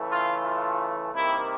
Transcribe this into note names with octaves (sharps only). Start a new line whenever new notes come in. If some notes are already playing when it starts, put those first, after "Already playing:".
Already playing: C#3 E3 A3
F4
F4
C3 D#3 G3 A#3 E4